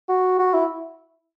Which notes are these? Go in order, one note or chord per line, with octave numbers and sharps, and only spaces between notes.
F#4
F#4
E4